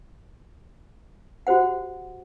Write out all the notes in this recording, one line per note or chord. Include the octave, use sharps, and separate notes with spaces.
F#4 G4 C5 F#5